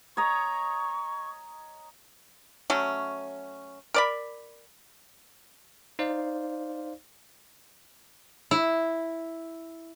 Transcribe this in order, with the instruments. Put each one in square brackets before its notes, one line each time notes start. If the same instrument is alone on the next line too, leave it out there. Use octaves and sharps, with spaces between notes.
[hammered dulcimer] C#5 D#5 A#5 [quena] C#6
[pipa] F#3 A3 C#4
A#4 D5 B5
[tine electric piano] D#4 C5 D5 F5
[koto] E4